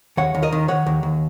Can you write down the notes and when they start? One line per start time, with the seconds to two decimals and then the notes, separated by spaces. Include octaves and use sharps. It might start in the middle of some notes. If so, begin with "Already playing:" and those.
0.17 D#2 C#5 F#5
0.35 D#2
0.43 A#4 D#5
0.52 D#3
0.68 D#3 C#5 F#5
0.86 D#2
1.03 D#2